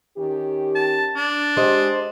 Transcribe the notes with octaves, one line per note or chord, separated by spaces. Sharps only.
D#3 C#4 G4
A5
D4
G#3 G4 C5 D#5